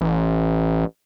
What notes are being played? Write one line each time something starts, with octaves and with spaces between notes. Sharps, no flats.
A1